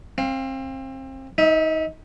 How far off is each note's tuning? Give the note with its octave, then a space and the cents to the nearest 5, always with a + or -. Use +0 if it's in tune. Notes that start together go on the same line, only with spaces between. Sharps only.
C4 +30 F5 +0
D#4 +25 E5 -20